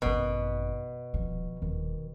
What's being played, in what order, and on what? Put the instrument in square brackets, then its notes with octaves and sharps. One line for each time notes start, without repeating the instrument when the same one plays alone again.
[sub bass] G#1 [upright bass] F#2 D#4 [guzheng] B2
[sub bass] D#1 [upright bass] D#3 F3
[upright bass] D#1 [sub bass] D#3